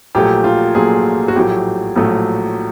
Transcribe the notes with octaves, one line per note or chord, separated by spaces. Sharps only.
A#1 A#2 F#3 A3 G4
F4
A#1 A#2 F#3 A3 G#4
F#4
A#1 A2 F#3 A3 G4
A#1 A2 F#3 A3